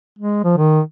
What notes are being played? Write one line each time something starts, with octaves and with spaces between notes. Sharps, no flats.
G#3
F3
D#3